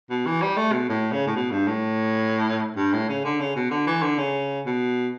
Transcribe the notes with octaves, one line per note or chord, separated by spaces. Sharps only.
B2
E3
G3
A3
B2
A2
C#3
A2
B2
G2
A2
G2
A2
C#3
D3
C#3
B2
D3
E3
D3
C#3
B2